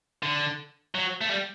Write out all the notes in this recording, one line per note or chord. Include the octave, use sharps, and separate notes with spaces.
D3
F#3
A3
G3